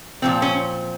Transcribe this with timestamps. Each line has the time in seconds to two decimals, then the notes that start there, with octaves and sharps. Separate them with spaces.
0.22 A#2 F3 C4
0.42 C#4